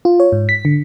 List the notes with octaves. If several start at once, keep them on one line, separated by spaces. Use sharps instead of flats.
F4
C#5
G#2
B6
D3